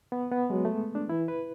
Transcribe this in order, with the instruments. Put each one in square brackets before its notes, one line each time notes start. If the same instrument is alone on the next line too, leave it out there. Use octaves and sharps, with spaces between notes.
[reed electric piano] B3
B3
[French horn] F#3 [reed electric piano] G#3
[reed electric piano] A3
D4
[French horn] E3 [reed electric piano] E4
[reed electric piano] B4